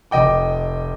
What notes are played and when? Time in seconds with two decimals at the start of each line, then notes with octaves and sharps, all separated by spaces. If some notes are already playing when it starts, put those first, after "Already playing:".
0.11 F1 D#5 G5 D6